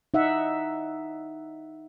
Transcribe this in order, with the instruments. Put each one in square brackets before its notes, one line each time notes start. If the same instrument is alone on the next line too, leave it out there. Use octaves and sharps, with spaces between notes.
[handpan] D#4 E5 F#5